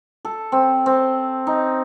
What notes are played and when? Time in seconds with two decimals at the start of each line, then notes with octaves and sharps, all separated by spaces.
0.25 A4
0.52 C4
0.86 C4
1.47 D#4